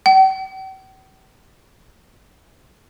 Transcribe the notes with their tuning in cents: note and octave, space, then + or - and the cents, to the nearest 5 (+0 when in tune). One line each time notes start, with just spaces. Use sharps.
G5 -45